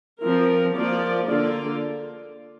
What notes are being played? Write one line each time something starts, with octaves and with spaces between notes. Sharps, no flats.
F3 C4 A#4
F3 A#3 F4 D5
D3 A#3 F4 D5